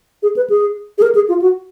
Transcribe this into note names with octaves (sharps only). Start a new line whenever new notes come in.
G#4
B4
G#4
G#4
A#4
G#4
F4
F#4